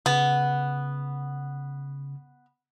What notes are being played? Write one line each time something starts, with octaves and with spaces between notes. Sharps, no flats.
C#3 B3